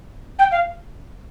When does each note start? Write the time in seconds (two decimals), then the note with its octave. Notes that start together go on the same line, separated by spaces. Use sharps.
0.38 G5
0.51 F5